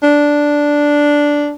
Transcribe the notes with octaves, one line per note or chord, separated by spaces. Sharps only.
D4